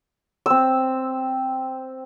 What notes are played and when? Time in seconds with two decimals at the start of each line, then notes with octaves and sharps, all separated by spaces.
0.46 C4 E6